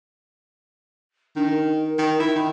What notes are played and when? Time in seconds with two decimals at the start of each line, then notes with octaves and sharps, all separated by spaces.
1.36 D#3 D4
1.49 A#4
1.98 D#3
2.20 E4
2.36 D#3